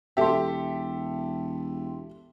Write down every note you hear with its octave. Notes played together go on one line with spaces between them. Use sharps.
E1 G4 A4 E5 G5 C6